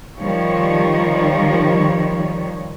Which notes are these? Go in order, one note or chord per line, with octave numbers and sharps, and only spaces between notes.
D#3 F3 G3 C#5